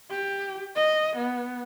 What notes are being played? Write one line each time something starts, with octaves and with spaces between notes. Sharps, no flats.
G4
D#5
B3